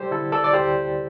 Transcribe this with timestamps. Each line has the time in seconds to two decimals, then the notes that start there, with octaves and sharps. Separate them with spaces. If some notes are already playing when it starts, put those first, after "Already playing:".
Already playing: G3 G4 A4 C5 D5
0.11 D3 E4 A4
0.32 A4 D5
0.44 D5
0.53 D2 G4 C5